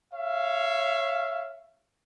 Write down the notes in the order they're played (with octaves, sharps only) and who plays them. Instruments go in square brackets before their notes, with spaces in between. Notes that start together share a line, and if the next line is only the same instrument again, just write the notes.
[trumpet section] C#5 E5 F5